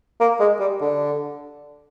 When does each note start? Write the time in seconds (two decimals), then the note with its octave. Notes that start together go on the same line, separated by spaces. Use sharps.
0.20 A#3
0.40 G#3
0.60 G3
0.81 D3